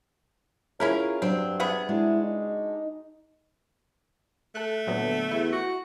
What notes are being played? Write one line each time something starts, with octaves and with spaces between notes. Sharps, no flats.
C#4 E4 F4 G#4 A#4 C#5
G2 F#3 C4 D4
C3 B3 G#4
G#3 D4 E4 F#4
D#4
A3 A4 F#6
D2 A#2 F#3 B3
E2 E4
F#4